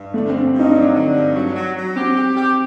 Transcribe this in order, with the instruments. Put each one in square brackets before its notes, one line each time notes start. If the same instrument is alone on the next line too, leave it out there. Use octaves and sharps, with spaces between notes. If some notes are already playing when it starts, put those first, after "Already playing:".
Already playing: [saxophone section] G2
[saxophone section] D3 [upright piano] A3
[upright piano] C4
[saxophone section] G2
G2
[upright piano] D#4
[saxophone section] F#3 [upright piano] D4
[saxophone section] D3
G2
F#3
F#3
F#3
[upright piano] C4 [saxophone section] G4
[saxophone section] G4
G4